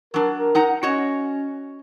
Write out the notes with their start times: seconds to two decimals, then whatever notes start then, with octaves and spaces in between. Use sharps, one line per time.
0.14 F#3 D4 A#4
0.37 A#4
0.55 D#4 F#5 A#5
0.83 C#4 F#4 C#5 D#5